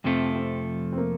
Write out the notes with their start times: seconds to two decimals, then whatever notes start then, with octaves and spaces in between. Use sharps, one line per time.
0.04 F2 C3 F3 A3 C4
0.36 C4
0.93 C4
0.98 A#3